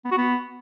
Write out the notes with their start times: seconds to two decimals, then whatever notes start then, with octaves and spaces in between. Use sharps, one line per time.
0.05 B3
0.11 F#4
0.18 B3